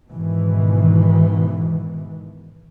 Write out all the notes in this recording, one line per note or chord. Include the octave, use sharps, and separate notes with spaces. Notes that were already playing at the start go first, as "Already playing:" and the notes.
G#2 B2 D#3 E3